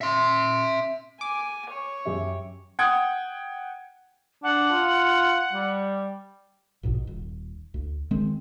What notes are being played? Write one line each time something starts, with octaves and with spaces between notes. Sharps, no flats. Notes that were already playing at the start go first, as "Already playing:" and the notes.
E5 C6
G#5 D6
C#5
F#2 G4 E5
F#5 G5 D#6 G#6
D4 F#5
F4
G3
A#1 G#2 B2
D#1
D2
D#3 G#3 C4